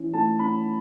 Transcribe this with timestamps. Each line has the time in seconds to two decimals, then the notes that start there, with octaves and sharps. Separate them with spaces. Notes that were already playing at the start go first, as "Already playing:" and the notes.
Already playing: E3 C#4 E4
0.13 A3 A5
0.39 C#4 B5